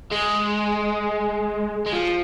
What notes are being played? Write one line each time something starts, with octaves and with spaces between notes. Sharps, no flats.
G#3
G#3
F3